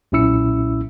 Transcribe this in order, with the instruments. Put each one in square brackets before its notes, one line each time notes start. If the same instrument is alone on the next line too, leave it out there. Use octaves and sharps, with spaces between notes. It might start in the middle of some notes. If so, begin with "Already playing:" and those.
[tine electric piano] B1 A#2 C#4 E4 E6 C#7